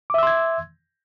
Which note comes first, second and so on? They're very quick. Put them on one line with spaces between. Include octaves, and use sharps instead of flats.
D6 E5 E6 C6 G#6